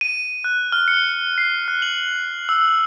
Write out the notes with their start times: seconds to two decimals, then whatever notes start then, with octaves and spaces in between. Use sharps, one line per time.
0.01 D#7
0.44 F#6
0.72 F6
0.88 C#7
1.38 C7
1.68 F#6
1.82 F#7
2.49 E6